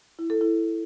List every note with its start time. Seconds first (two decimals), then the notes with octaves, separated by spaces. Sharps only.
0.19 E4
0.30 A4
0.41 E4